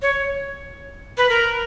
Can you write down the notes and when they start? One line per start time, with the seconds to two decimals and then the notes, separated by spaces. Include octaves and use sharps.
0.02 C#5
1.17 B4
1.29 A#4